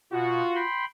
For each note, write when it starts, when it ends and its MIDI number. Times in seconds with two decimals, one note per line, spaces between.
0.12 0.42 47
0.12 0.62 65
0.12 0.62 66
0.55 0.85 79
0.55 0.85 83
0.55 0.85 84